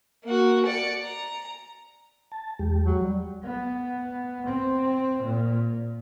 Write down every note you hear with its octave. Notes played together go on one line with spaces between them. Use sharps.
A#3 F#4
D5 C#7
A#5
A5
E2 G#3 G4
F#3
G3
B3
C4
A#2